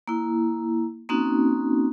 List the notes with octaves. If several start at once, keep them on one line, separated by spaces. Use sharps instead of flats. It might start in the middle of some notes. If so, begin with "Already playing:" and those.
A#3 E4
A#3 C4 C#4 D#4 F#4